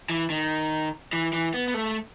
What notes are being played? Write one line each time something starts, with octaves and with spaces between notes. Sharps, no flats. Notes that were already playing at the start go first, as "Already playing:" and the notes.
E3
D#3
E3
E3
B3
B3
A3